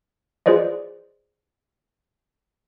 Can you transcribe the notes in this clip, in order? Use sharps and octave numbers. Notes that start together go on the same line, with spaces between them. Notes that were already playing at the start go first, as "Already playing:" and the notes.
F4 G#4 B4 C5 D5 D#5